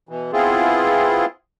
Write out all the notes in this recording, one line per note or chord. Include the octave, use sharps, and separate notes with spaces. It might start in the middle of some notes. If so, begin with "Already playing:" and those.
B2 E3
B3 C4 E4 F4 G#4